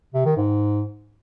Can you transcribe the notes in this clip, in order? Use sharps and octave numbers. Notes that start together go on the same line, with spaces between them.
C3
D#3
G#2